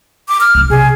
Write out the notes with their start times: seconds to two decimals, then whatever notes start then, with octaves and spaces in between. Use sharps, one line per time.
0.28 D6
0.41 F6
0.55 C2 F3
0.70 C3 G#4